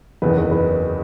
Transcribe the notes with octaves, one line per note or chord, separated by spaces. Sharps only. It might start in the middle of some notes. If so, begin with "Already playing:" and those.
F#1 E2 D#3 B4
B4
B4